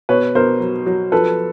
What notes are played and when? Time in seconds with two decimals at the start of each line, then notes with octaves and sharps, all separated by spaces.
0.09 B2 B4 C#5
0.35 B2 A#4 C5
0.60 F#3
0.86 F#3
1.12 F3 A4 B4